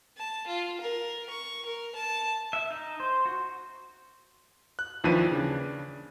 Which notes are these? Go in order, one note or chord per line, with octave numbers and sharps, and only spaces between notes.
A5
F4
A#4
C#6
A#4
A5
E5
D#4
C5
F#4
F#6
D#2 E3 F3 D4 B4 D#7
C#3 D4